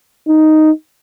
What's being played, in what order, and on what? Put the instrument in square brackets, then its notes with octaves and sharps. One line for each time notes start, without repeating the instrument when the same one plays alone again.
[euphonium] D#4